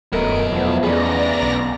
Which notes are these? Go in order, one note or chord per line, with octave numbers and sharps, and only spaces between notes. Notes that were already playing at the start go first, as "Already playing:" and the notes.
D#1 F#2 F#3 A3 B3 A#4 D#5 D7
E2 B2 F3 A3 B3
E2 B3 C#4 G#4 D5 A#5 A#6
B1